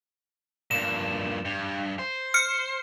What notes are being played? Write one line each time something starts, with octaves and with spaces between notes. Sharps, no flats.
G2 A#2 E7
G2
C5
F6 C#7